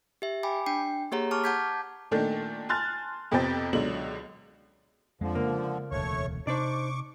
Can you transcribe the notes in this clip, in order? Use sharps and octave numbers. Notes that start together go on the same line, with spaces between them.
G4 E5
G5 G#5 B5 D6
D4 G5 C7
A#3 G4 G#4 C#5 F#5 A#5
A5 C#6 D6 F6
F#5 A5 D6 G6 G#6 B6
A#2 D#3 A3 D4 A4
G#5 A5 C6 F6 F#6 A6
F2 C3 B3 C5 G5 A6
C#2 B2 D3 F#3 F#7
F2 D3 F3 G#3
C#3 A#3
E1 D2 A3 C#5 C#6
C3 D4 D#4 C5 D5 C#6 D6